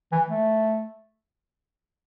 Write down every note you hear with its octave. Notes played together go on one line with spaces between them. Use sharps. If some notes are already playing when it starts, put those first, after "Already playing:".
E3
A3